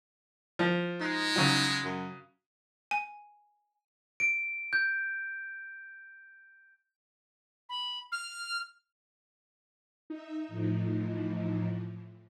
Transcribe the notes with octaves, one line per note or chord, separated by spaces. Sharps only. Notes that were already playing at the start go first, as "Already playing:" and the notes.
F3
G#3 D#4
C#3 F#3
F#2
G#5
D7
G6
B5
F6
D#4 E5
A2 E3 F3